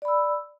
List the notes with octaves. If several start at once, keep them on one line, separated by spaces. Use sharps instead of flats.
D5 B5 E6